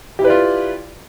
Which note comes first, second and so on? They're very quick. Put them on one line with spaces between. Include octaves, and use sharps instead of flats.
G4 E4 B4 D5 F4